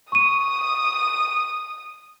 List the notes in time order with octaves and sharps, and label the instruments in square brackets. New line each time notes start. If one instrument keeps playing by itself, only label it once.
[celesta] C#6 D#7 [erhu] D#6